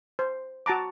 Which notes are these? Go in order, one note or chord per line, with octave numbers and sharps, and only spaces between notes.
C5
F#4 A5 A#5 D6